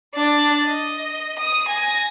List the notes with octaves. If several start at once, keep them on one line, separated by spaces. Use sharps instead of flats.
D4 A6
D#5
D#6
G#5 A#6